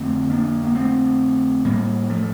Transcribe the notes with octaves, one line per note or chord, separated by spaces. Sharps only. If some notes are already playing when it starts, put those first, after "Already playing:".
Already playing: F2 D3 A3 C4
A#3 D4
A#3
A3 C4
A2 G3 A#3
F3 A3